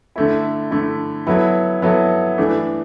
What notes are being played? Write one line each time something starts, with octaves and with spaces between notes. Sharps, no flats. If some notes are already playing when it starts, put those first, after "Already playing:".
D3 A3 E4
D3 A3 E4
F#3 B3 E4 A4
F#3 B3 E4 A4
E3 A3 D4